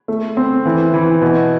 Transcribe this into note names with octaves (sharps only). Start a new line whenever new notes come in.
A3
C4
E3
E3
B2